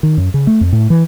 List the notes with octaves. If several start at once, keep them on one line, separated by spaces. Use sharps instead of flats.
D#3
F#2
C#3
A3
F2
A2
E3